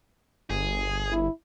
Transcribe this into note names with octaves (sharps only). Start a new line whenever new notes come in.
G1 G#4
E4